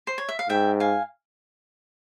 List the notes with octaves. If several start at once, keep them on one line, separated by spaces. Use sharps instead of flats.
C5
C#5
E5
F5
G#2 E5 G5
F5 G#5